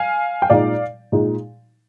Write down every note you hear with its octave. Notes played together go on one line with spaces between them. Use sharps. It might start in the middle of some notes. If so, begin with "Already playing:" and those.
Already playing: F5 G#5
G5
A#2 G#3 D#4 D5 F5
A#2 G#3 D#4